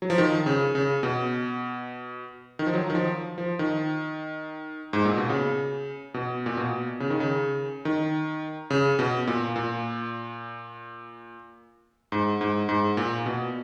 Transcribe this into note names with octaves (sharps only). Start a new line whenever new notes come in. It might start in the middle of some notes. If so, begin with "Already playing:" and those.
F#3
F3
D#3
C#3
C#3
B2
D#3
F3
F#3
D#3
F3
F3
D#3
G#2
A#2
B2
C#3
B2
A#2
B2
C#3
D#3
C#3
D#3
C#3
B2
A#2
A#2
G#2
G#2
G#2
A#2
B2